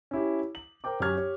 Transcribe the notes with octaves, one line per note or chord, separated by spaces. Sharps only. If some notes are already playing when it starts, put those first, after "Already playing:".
C#4 E4 G4
F#7
A#4 C5 G5 D6
F#2 C#4 G4 C#6 F6 G#6
G4 C#5